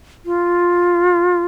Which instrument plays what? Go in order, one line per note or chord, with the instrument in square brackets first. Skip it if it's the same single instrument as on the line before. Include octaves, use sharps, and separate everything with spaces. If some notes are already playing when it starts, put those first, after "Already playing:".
[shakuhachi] F4